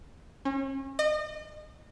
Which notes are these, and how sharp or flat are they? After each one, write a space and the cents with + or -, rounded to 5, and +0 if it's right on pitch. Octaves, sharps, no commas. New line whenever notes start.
C#4 -35
D#5 -35